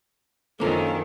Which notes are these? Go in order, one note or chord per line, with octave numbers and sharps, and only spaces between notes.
F#2 D#3 F3 A#3 C#4 D4 A4 A#4